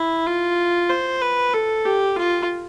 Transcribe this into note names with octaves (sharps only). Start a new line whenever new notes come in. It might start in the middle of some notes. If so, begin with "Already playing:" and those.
Already playing: E4
F4
C5
B4
A4
G4
F4